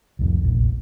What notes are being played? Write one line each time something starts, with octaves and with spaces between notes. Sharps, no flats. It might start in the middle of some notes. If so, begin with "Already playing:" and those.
C2 F2
E1 A#1